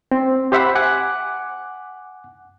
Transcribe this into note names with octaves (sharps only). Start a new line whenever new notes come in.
C4
G4 C5 E5 F#5 B5
F#5 G#5 D6 F#6